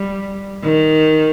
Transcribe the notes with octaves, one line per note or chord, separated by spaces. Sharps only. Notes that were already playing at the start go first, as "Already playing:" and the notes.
Already playing: G3
D#3